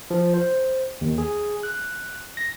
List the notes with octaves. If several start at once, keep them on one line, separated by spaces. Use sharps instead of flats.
F3
C5
D#2
G#4
F#6
A#6